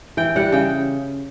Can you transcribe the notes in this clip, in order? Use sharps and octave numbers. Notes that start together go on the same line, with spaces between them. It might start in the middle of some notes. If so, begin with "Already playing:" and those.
E3 G5
G3 F#5
C#3 G5